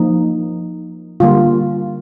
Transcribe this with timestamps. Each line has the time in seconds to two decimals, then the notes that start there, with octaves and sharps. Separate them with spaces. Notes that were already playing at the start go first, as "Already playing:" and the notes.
Already playing: F3 A#3 D#4
1.20 D3 G3 A#3 F4